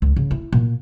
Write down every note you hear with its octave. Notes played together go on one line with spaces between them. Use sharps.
C#2
C#3
E4
A#2